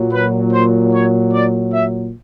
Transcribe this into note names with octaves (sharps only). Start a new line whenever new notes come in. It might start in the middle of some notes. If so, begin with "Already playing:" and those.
Already playing: A#2 F#3
B4
C5
C#5
D5
E5